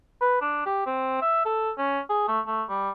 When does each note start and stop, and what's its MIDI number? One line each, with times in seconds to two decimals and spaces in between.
0.21 0.40 71
0.41 0.61 62
0.66 0.83 67
0.86 1.20 60
1.22 1.42 76
1.46 1.71 69
1.79 2.00 61
2.10 2.27 68
2.28 2.40 57
2.47 2.63 57
2.69 2.90 55